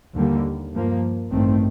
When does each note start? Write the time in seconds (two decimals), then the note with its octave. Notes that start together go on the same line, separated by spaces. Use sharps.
0.14 D#2 D3 G3 A#3
0.73 G2 F3 A#3
1.31 A1 G2 D#3 A3 C4